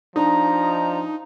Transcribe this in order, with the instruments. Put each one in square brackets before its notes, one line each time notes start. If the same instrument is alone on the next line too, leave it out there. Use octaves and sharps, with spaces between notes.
[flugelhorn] F3 [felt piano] D4 [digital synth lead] D#4 [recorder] A#5